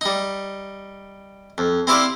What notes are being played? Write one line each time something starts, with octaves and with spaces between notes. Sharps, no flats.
G3 D#4
F2
C4 E4 G4 C5 D5 F5